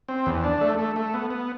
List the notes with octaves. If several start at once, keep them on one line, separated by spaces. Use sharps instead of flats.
C4
E2
D4
A3
A3
A3
B3
B3